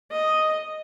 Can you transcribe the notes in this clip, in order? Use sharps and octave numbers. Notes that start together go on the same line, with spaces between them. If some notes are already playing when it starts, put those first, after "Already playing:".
D#5